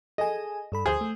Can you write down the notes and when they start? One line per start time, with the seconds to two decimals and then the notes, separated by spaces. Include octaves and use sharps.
0.18 G#4 A4 D#5 G#5
0.72 G2 A4 B5
0.86 D2 G#4 C5
1.01 A3